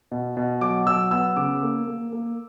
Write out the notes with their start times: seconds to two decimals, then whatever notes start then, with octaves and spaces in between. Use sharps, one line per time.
0.11 B2
0.37 B2
0.61 F#3 D6
0.86 F#3 E6
1.11 B3 E6
1.36 C#3 D6
1.63 A#3
1.88 A#3
2.13 A#3